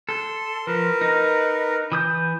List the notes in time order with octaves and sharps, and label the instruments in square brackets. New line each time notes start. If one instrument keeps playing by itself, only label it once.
[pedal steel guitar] A4 [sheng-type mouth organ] C6
[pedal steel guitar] F3 [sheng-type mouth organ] A#4 B4
[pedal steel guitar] D#4
E3 D#6 G6